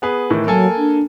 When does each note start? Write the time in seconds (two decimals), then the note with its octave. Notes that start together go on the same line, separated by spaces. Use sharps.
0.02 B3 G#4 B4
0.30 A2 D#3 E3
0.47 F#3 A#3 A4 G#5
0.77 D4